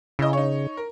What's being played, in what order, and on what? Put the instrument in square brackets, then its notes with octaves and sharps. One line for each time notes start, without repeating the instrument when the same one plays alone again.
[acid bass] C#3 [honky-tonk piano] E4 D#5
[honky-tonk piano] D#4 C#5
A#4